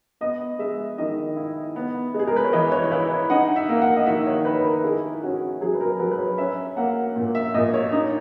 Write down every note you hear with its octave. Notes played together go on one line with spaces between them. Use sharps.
B3 D#5
G#3 E5
D#3 D#5
E4
B3
G#3
G#4
A#4
B4
C#5
E3 D#5
C#5
C#5
E4 B4
D#4 F#5
E5
A#3
F#5
D#5
D#3 E5
C#5
D#3 B4
B4
A#4
E4 G#4
C#4 F#4
F#3 G#4
B4
A#4
F#3 B4
B4
C#5
C#4 E5
A#3 F#5
A#2
E5
A#2 D#5
C#5
D#4